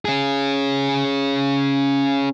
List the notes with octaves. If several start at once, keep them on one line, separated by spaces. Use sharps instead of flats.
C#4 G#4